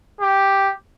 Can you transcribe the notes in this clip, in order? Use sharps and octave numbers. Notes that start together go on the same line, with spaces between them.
G4